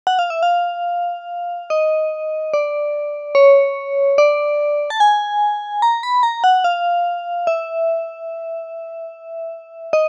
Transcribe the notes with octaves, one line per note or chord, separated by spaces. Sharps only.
F#5
F5
E5
F5
D#5
D5
C#5
D5
A5
G#5
A#5
B5
A#5
F#5
F5
E5
D#5